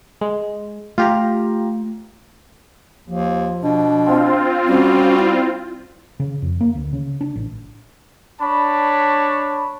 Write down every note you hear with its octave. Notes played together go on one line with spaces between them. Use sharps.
G#3
A3 F4 G4 A#5
D#2 F3
B2 D4
C4 F4
G3 C#4 F#4
E4
C#3
F2
A#3
D2
C#3
D4
A1
D4 C#5 A5 B5